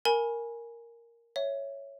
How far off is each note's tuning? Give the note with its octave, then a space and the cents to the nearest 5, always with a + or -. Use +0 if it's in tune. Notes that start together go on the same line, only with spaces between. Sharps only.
A#4 +0 G#5 +0 B5 -25
C#5 +0 E5 +0